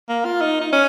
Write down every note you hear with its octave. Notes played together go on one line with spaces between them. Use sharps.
A#3
F4
D#4
D#4
C#4